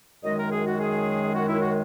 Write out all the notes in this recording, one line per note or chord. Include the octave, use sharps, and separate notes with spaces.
F#2 D#3 G#3 D#5
A#4
G#4
F#4
G#4
F#4
E4
F#4